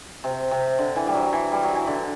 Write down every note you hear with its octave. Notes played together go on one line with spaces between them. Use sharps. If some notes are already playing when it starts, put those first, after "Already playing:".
C3
C3
D3
E3
G3
F#3
E3
G3
F#3
E3
D3